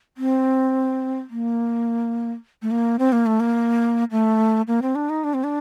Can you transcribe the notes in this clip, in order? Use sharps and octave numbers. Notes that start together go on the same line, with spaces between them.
C4
A#3
A3
A#3
C4
A#3
A3
A#3
A3
A#3
C4
D4
D#4
D4
C4
D4